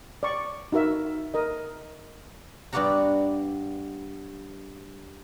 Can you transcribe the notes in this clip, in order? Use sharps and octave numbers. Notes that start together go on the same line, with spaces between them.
D5 C#6
D#4 F#4 A#4 E5
A#4 D#5
G2 B3 F#4 D5 F#5 A#5